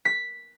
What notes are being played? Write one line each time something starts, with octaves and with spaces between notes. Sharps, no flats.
B6